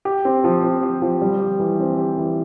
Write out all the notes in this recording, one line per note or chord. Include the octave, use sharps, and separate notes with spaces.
G4
C4
F3
C4
G4
F3
G3
G4
E3
C4
G4
E3